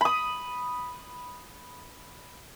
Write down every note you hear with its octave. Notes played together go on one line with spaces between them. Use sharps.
B5 D#6